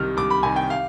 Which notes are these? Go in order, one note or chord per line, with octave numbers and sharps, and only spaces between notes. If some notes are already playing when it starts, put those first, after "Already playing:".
Already playing: C2 C3 D#3 F6
C2 D6
B5
C3 D#3 G#5
G5
F5